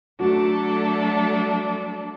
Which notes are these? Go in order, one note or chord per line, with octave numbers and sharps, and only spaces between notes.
F#3 A3 D4 F#4 A4